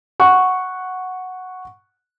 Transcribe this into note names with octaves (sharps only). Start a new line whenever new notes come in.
F#5 C#6